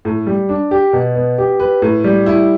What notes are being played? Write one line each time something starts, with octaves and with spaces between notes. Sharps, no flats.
A2
G3
D4
G4
B2
B3
G4
B4
A2
G3
E4